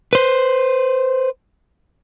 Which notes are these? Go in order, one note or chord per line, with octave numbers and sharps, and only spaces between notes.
B4 C5